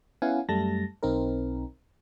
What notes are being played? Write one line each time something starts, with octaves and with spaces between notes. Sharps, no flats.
B3 C#4 E4 F5 F#5 G#5
F#2 G3 A3 A5 A#6
B1 C4 D#4 A#4